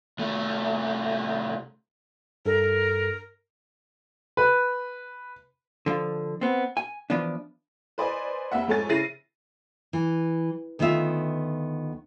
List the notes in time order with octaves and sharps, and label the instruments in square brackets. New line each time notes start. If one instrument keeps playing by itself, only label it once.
[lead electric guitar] C2 A3
[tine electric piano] G2 A4 [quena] A#4
[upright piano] B4
[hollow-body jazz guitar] D3 F3
B3 C4
G#5
E3 F3 B3 D4
[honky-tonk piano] B4 C5 D5 D#5 G#5
F1 A#3 E5 F#5
F2 G#2 A3 C#5 G#5 A6
C#3 E4 A6 A#6 C7 D#7
[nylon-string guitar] E3
D2 D#3 B3 F4 E5